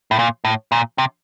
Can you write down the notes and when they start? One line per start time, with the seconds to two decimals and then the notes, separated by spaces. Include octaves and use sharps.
0.11 A2
0.19 A#2
0.45 A2
0.72 A#2
0.98 C3